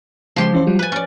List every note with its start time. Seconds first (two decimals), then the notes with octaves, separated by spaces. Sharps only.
0.36 C#3 F3 G#3 G4 C6
0.53 E3 C#4 C5
0.67 F#3 G3 F4
0.79 B4 G#5 F#6 A6
0.92 C#4 D5